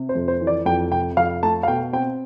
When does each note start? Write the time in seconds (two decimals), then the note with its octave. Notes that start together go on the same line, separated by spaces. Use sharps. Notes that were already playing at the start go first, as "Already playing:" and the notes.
Already playing: C3
0.09 C5
0.15 F2
0.28 C5
0.41 E3
0.47 D5
0.66 F2 G5
0.91 C3 G5
1.17 F2 F5
1.42 A3 A5
1.63 F5
1.68 B2 G5
1.93 C4 G5